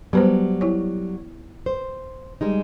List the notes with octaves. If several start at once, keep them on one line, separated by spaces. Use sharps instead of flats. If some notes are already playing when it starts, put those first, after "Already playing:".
F#3 G3 B3 B4 C5
E4 C#5
C5
G3 G#3 D#4